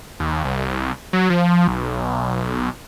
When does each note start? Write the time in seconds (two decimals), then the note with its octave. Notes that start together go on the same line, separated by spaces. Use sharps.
0.20 D#2
0.44 C2
1.13 F#3
1.30 F3
1.68 B1